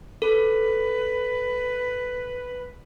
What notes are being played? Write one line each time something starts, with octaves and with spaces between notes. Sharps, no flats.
A4 B4